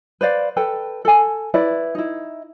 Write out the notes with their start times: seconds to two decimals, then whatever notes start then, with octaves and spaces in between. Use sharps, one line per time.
0.21 B4 C5 D5 F5
0.57 A4 B4 G5
1.05 A4 G#5
1.54 E4 B4 D5
1.95 D#4 E4